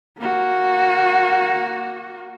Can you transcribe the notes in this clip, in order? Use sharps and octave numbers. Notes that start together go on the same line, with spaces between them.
A#3 F#4